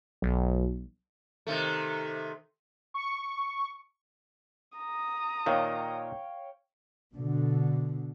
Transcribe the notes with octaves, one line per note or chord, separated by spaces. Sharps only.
B1
C3 D#3 A3
C#6
A#5 D#6
A#2 D#3 C#5 F5 G5
B2 D3